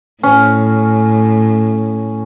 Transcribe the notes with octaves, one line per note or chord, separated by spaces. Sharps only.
A2 C#4